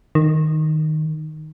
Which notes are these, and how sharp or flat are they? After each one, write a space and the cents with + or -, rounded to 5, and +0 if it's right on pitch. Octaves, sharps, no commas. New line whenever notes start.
D#3 -5